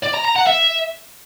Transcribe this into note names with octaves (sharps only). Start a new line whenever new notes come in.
D5
A#5
A#5
F#5
E5